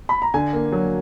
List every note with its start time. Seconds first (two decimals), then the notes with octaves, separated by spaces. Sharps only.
0.09 B5
0.22 A#5
0.34 D3 G#5
0.53 A#3
0.72 F#3